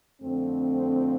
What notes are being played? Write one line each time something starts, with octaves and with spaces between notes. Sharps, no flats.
F2 D3 A3 C4